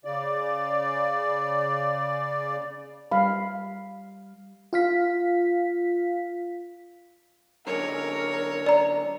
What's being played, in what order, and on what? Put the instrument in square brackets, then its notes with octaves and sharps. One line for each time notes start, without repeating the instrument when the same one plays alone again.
[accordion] C#3 D5
[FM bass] G3 [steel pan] F5 B5
[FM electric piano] F4 F5 B6
[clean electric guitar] F#2 D3 G#3 [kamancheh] A#4 [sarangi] C#5
[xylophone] D5 A#5